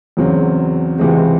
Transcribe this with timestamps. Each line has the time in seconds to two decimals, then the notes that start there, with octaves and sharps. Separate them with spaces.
0.17 E2 C#3 F#3 C4
0.98 C#2 C3 E3 G#3 C4